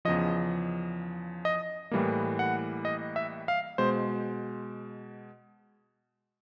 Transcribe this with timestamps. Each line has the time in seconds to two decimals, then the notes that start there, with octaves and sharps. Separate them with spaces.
0.05 E2 C#3 F3 D#5
1.45 D#5
1.91 A2 E3 G3 A#3
2.39 F#5
2.85 D#5
3.16 E5
3.48 F5
3.78 B2 G#3 C5